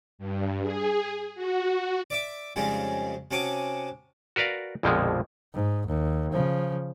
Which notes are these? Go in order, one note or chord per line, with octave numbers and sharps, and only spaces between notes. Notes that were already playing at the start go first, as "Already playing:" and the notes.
G2
G#4
F#4
D5 E5 D6
F2 C#3 G3 G#3 D#4
C3 C#4 F#4 A5 D6 D#6
F#4 A#4 B4 D5 F5
A#1 F2 B2 D3 F3 G#3
G#2
D#2
C#3 F3